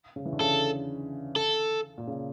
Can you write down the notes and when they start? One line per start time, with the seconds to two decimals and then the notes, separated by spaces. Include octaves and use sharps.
0.16 C#3
0.25 E3
0.33 D3
0.40 C#3 A4
1.36 A4
1.98 A#2
2.07 C#3